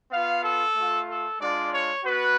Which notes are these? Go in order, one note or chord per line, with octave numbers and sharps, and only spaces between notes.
B3 F4 F5
A4
A3 F4
A4
G#3 D4 F4 D5
C#5
B3 F#4 B4